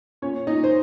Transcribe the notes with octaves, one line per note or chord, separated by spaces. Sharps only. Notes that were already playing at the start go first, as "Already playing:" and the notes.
A#2 C#4 C#5
A#2 D#4 D#5
C5